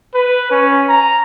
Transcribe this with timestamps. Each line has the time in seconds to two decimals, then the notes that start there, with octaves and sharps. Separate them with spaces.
0.15 B4
0.51 C#4
0.89 A#5